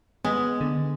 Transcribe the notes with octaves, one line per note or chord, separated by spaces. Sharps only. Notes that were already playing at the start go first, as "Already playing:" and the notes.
G#3 B3
D3